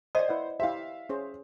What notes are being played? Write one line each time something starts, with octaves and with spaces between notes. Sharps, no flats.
C5 D5 D#5 D#6
E4 B4 F#5
E4 G4 C5 E5 F5
C#4 G#4 C5